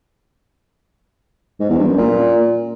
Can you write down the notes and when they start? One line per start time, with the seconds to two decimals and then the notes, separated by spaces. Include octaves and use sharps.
1.60 G#2
1.69 E2
1.79 G2
1.88 F#2
1.98 A#2